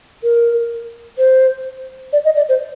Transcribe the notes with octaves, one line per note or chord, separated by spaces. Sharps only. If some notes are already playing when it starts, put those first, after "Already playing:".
A#4
C5
D5
D#5
D5
C5